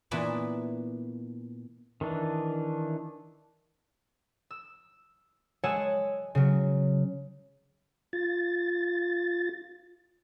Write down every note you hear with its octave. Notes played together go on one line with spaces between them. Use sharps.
A#2 E3 B3 D4 E4 A5
D#3 E3 D4
E6
G#3 C#5 F#5 G#5 A5 E6
C#3 F#3
F4 A6